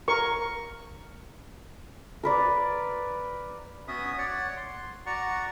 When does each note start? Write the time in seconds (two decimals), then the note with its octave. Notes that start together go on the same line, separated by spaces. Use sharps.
0.08 A#4 C#6
2.23 A#4 B4 D5
3.88 B3 C#4 F#4 E5 D#6
4.18 C#5 D5 F#5
4.57 C6
5.06 F#4 D5 F#5 A#5 C#6